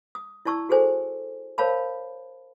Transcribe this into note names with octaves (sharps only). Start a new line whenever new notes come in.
D#6
E4 D5 A5 C#6 E6
F#4 G#4 A4 C5 G#5
A#4 C5 C#5 F5 A5 B5